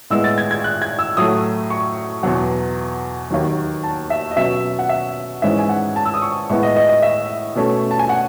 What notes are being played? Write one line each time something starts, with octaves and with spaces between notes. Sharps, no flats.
A2 G#3 B3 E6
A6
G#6
G#6
F#6
G#6
E6
A2 F#3 A3 D#6
C#6
E2 B2 F#3 F#5
D#2 D#3 F#3
A5
E5
D#5
B2 F#3 C#4 E5
F#5
E5
G#2 E3 G#3 C#4 E5
G#5
F#5
A5
E6
D#6
C#6
A2 G#3 B3 C#6
D#5
D#5
D#5
E5
B2 A3 C#4
A5
G#5
F#5